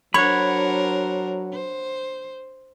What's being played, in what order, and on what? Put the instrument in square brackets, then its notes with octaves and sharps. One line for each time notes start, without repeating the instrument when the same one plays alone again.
[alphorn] F#3 [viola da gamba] D4 A#4 C5 [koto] C#5 [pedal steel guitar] F#5 B5
[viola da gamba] C5